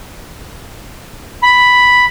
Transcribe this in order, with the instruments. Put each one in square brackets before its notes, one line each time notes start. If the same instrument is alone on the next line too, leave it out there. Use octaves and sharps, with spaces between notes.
[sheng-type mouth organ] B5